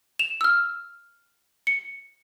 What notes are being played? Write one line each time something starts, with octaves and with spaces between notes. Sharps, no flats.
E7 F7
E6 F6
C#7